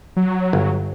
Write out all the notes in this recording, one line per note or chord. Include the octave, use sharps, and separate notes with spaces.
F#3
G1